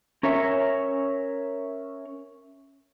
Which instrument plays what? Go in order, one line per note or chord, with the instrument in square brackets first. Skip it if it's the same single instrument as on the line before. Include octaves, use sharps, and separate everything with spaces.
[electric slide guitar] C#4 A#4 C#5 E5